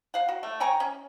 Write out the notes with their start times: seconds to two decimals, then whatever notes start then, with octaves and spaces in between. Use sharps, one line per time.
0.14 F5 F#5
0.29 F#4
0.43 A3
0.60 G5 G#5 A#5 C#6
0.80 C#4